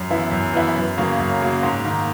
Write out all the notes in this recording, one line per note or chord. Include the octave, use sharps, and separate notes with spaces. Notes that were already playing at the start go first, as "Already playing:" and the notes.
Already playing: F#2
E3 B3 E4
F#2
E3 B3 E4
F#2
C#3 F#3 A#3
F#2
C#3 F#3 A#3
G#2
D#3 A#3